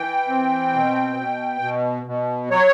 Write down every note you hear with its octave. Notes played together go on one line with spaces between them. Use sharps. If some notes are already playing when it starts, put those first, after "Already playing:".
Already playing: E3 G5
C4
B2
B2
B2
B2
F#3 C#5